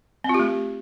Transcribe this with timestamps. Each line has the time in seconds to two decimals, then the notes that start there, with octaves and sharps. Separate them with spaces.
0.24 C4
0.29 F4
0.34 G4
0.39 A3